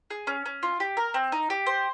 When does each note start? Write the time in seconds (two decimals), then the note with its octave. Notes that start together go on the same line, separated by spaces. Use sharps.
0.10 G#4
0.27 C#4
0.46 C#4
0.63 F4
0.80 G4
0.97 A#4
1.14 C4
1.32 D#4
1.50 G4
1.66 C5